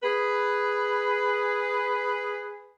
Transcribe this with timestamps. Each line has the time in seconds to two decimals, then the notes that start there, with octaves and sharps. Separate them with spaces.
0.03 G#4 B4